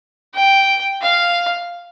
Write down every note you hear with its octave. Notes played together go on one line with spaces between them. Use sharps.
G5
F5